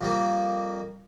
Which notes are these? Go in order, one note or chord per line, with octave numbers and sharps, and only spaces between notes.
F2 G3 A#3